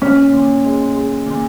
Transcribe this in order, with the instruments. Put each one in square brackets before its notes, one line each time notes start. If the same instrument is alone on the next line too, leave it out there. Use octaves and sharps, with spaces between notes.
[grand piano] A#2 [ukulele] C#4
[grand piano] A#2
G#3
G#3
A#2